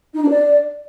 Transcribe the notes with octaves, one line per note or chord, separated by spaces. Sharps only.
D#4
D4
D5